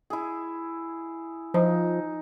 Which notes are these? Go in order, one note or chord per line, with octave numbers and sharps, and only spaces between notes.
E4 G#4
F3 D#4